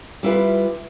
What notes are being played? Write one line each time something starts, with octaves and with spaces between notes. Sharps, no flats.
G3 E4 F4 B4